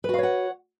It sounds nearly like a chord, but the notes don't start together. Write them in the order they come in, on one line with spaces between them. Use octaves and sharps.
B4 F#4 F5 C#5 F#5